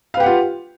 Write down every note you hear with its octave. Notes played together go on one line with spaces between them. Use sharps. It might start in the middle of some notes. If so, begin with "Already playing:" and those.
F4 G4 B4 F5 F#5